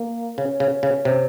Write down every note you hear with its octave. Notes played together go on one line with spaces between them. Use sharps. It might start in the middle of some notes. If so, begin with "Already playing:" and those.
Already playing: A#3
C#3 C#4
C#3
C#3
C3